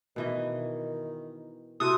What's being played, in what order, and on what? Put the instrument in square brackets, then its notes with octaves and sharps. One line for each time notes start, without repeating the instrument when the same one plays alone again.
[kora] B2 E3 D#5 [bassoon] D#3
[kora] C3 A4 [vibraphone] E4 F#4 C6 [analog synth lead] D#6